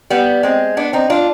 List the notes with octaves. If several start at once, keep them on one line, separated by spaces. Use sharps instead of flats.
G3 B3
G#3 C4
B3 D4
C4 D#4
D4 F4